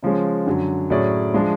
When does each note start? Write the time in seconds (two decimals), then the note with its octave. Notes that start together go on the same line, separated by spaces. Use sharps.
0.03 C#3 F3 G#3 C#4
0.46 F#2 D3 F#3
0.90 A2 F#3 C#4 G#4 D5
1.34 F3 G#3 D4